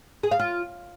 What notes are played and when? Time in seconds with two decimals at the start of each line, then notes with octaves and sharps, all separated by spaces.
0.23 G#4
0.31 F5
0.40 F4